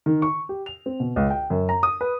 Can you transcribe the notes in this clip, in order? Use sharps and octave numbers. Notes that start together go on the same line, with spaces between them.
D#3
C#6
G4
F7
C4
B2
C#2
G5
F#2
A#5
D#6
B4